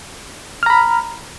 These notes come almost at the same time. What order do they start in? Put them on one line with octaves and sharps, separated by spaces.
F6 A#5 B5